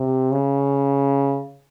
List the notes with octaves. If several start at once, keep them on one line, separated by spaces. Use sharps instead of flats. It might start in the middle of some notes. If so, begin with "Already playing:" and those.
Already playing: C3
C#3